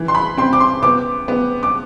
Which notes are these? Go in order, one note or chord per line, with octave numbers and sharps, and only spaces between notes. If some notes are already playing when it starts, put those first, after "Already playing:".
Already playing: E3
C6
B5
C4 C6
D6
C6
B3 D6
B3
D6